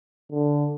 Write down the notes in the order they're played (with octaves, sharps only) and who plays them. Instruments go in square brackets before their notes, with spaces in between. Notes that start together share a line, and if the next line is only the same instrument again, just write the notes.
[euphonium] D3